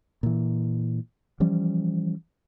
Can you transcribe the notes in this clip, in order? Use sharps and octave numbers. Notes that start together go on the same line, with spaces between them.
A#2 E3
E3 F3 G3 C#4